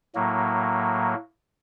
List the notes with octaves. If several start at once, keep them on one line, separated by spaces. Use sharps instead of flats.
A2 F#3 A#3